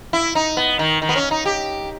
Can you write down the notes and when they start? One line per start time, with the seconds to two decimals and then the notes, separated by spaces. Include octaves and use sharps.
0.13 E4
0.35 D#4
0.57 B3
0.79 D#3
1.02 D#3
1.09 B3
1.16 C#4
1.31 D#4
1.46 G4